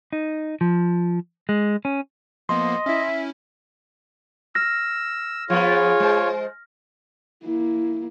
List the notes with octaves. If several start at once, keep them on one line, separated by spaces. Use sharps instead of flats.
D#4
F3
G#3
C#4
F3 A#3 B3 D#5 C6
C#4 E4 E5
E6 F6 A#6
F3 B3 F4 G#4 C#5
G#3 C5
A#3 E4